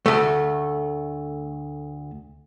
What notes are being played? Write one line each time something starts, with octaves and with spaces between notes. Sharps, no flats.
D2 A3